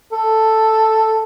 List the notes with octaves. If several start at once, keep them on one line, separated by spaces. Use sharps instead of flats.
A4